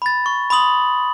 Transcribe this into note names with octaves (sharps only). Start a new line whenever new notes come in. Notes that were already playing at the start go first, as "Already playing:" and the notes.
B5 A6
C#6
B5 C6 D#6 F#7